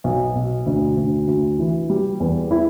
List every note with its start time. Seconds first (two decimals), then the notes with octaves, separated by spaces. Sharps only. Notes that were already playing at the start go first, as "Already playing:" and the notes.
0.04 B1
0.36 B2
0.66 D2
0.97 D2
1.27 D2
1.59 E3
1.90 G3
2.20 E2
2.51 E4